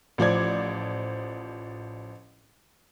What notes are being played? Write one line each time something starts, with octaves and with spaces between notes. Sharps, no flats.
A1 F3 D5 G#6